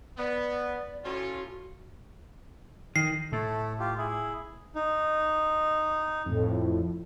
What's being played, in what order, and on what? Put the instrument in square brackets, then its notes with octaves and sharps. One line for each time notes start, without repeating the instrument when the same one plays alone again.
[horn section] B3 [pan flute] D5
[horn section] A2 C#4 F4 [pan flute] F#4
[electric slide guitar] D#3 [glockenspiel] C7
[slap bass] A2 [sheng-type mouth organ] A3 A4
[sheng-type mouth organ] F4 G4
E4 G#4
D#4
[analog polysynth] F2 A2